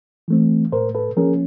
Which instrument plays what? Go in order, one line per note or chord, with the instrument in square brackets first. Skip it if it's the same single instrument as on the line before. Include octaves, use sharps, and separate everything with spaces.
[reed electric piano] E3 A3 C4
A2 A#4 C5
A4 B4
F3 A#3 C#4 G#4 A#4